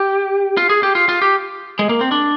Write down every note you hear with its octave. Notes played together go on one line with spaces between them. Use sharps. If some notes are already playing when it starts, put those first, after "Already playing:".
Already playing: G4
F4
G#4
G4
F4
F4
G4
G#3
A#3
C4
D4